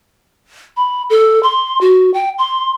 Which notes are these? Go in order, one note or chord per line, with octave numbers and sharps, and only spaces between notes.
B5
A4
C6
F#4
G5
C6